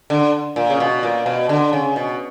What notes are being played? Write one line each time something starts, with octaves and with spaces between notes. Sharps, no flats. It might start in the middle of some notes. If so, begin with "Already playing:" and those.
D3
A#2
C#3
B2
A#2
B2
D3
C#3
B2